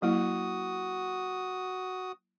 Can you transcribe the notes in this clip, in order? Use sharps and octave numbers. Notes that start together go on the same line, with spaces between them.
F#3 A#3 E4 F#4 D#6